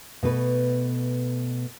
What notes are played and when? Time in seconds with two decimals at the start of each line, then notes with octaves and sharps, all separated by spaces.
0.23 B2 A3 B4